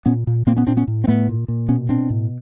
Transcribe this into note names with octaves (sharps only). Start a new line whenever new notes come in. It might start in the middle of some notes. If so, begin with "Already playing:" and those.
A#2 B3 C#4
A#2
A#2 A#3 C4
B3 C#4
A#2 C4 D4
B3 C#4
A2
C4
A2 A3 B3
A#2
A#2
B2 B3 C#4
B2 C4 D4
A2